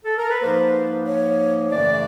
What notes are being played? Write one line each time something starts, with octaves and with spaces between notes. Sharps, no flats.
A4
A#4
B4
G#2 F3 A#3 C5
C#5
F#2 C#3 E3 A3 D5